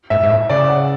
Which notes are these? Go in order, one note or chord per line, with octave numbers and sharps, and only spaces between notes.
G#2 E5
G#2
A2 E5
C#3 D5
F#5